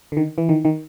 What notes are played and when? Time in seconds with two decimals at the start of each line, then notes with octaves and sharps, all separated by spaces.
0.12 D3
0.17 D#3
0.38 E3
0.49 D#3
0.65 D#3